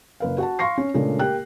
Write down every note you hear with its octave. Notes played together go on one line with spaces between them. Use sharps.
F#1 B4 F5
F#4 F#5 A5
F5 C6 C#6 A#6 C7
C#4
A#2 C#3 G#3 A3 D4
A#3 G4 G5 F#6